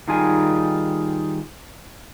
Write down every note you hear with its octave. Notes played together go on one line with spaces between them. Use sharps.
D#3 G3 D#4 F4 G#4 G#5